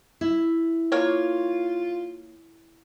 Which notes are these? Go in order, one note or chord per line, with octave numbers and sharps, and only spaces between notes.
E4
A#3 F4 C#5